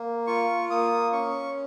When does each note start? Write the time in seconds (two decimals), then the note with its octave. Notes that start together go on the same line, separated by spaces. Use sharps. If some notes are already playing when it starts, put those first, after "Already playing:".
Already playing: A#3
0.27 F4 C#6
0.70 A#3 D#6
1.12 C#4 C#6